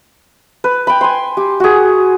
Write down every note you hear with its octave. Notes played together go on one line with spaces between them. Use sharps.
B4
G5 B5
G#5 C6
G4
F#4 G#4